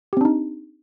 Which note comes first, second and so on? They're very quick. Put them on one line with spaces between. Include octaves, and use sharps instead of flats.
G4 C4 D4 D#4